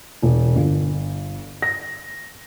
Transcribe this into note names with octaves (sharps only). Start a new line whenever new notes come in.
E1
G1
A#6